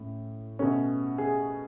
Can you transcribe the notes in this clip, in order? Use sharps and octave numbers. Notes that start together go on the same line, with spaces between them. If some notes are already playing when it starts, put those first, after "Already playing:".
Already playing: A2 C#4
B2 A3 C#4
G#4